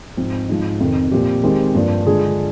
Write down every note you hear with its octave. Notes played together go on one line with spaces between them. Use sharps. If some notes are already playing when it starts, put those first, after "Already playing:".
G#2 F3 C4
G#2 F3 G#3 D#4
F2 C3 D#3
A#2 F3 C4 G4
D#3 G#3 C4 G4
G2 F3 A#3 D4
D3 G#3 D4 F4 G#4